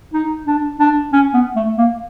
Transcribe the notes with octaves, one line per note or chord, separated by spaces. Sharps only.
D#4
D4
D4
C#4
B3
A3
A#3